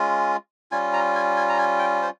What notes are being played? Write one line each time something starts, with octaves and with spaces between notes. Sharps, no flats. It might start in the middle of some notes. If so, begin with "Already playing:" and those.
Already playing: G#3 C#4 F4
G3 C#4 F4 G#5
A#5
G#5
G#5
A#5
G#5
G5
C5